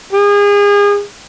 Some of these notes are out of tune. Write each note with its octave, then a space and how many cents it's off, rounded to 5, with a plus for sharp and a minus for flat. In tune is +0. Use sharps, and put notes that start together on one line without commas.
G#4 -35